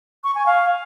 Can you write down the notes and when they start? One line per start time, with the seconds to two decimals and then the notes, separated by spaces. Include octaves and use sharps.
0.24 C#6
0.35 G#5
0.46 F5